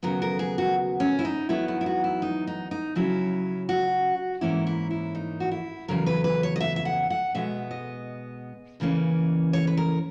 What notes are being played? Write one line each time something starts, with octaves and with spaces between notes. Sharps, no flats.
D#2 C#3 F#3 B3 A#4
A#4
G#4
F#4
C#4
E4
D#4
E2 D#3 F#3 B3 E4
E4
E4
F#4
E4
D#4
D#4
D#4
C#3 F#3 C#4 E4
F#4
G#2 E3 A#3 C#4 E4
E4
E4
D#4
F#4
E4
E2 C#3 F#3 A#4
B4
B4
C#5
D#5
E5
E5
F#5
F#5
B2 G#3 B3 E5
D#5
E2 C#3 E3 A#3 C#4
C#5
B4
A#4